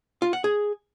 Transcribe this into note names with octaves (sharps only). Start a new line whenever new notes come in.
F4
F#5
G#4